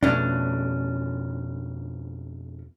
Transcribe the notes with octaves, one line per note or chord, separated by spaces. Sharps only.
F2 B2 A3 C#4 D4